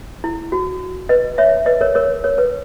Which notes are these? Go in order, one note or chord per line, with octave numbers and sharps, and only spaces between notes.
E4
F#4
B4 D#5
C#5 E5
B4 D#5
A#4 C#5
A#4 C#5
A#4 C#5
B4